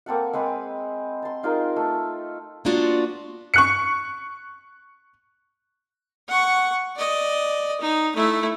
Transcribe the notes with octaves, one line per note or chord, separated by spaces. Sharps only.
A#3 C4 A4 F#5
G#3 C4 B4
A5 C6
D#4 F4 G#4 A#4
A3
A#3 B3 D4 F4 F#4
C#6 F#6 C#7
F#5 C#6
D5 D#5
D#4
A3 E4